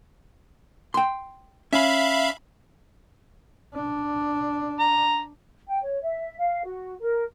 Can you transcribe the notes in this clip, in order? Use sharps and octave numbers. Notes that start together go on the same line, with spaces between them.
G5 C6
C#4 E5 F5 B5
D4
A#5
G5
C#5
E5
F5
F#4
A#4